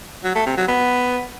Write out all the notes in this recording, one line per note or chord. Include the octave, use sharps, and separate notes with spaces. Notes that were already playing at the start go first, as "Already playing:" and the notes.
F#3
A3
C3
F#3
B3